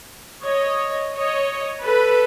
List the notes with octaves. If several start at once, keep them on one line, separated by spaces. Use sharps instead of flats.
C#5 D#5
C#5 D#5
A4 B4